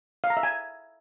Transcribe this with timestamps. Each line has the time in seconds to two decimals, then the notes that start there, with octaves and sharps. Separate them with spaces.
0.24 F5
0.30 A#5
0.37 E5
0.43 G#5